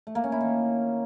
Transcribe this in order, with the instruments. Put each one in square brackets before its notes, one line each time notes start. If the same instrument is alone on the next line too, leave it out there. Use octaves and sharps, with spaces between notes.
[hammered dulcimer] A3
A#3
C#4
E4
D#3